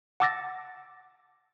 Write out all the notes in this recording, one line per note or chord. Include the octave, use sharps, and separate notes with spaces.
F#5 A5 D6 E6 A6 A#6